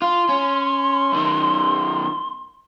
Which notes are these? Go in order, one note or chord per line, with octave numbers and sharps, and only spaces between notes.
F4 C6
C#4
B1 D#3